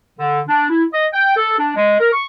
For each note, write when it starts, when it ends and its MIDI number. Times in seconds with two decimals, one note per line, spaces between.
0.19 0.41 50
0.48 0.69 62
0.69 0.84 64
0.93 1.05 75
1.13 1.36 79
1.37 1.58 69
1.59 1.76 62
1.76 1.96 56
1.99 2.12 70
2.13 2.26 85